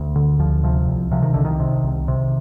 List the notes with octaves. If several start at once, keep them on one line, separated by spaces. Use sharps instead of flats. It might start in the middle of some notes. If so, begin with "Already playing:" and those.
Already playing: D2
D3
D2 F3
C3 F3
C2
C3 F3
D#3
C2 D3
D#3
C3
C2
C3